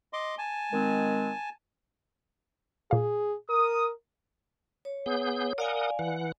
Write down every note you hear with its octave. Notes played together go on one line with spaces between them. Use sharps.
D#5 C6 D6
G#5 A5
D#3 G#3 C4
A#2 G#4 F5
A#4 D#6
C#5
B3 G#4 G6
A#4 D5 F5 F#5 G#5 D#6
E3 F#5